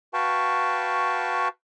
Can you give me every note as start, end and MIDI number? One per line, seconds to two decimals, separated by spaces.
0.14 1.48 66
0.14 1.48 71
0.14 1.48 77
0.14 1.48 79
0.14 1.48 81
0.14 1.48 85